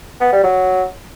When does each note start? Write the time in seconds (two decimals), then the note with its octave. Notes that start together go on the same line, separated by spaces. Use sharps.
0.21 B3
0.32 G3
0.44 F#3